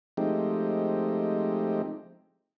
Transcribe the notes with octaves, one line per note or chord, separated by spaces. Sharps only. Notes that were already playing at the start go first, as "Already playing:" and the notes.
F3 G#3 A3 C4 D#4 G4